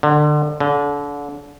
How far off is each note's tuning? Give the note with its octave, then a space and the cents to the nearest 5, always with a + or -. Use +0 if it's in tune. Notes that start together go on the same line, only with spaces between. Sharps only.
D3 +30
D3 -30